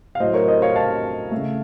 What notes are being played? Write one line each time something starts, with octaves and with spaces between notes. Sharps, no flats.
F5
A2 F#3 A3 C5 D#5
A#4 C#5
C5 D#5
C#5 F5
F5 A5
C#3 A3